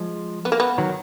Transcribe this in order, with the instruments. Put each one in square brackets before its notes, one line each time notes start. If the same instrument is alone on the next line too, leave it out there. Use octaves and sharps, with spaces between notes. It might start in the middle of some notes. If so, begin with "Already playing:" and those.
Already playing: [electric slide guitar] F3 G#3
[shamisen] B3
A#3
B3
[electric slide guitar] D#3 F#3